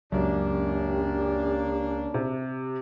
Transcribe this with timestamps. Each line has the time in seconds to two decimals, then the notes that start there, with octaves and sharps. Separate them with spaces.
0.12 C#2 F#2 A#3 C#4 D4 G4
2.14 C3